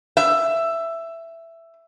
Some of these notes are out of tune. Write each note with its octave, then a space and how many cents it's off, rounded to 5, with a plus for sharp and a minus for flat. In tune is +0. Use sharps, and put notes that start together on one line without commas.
E5 +10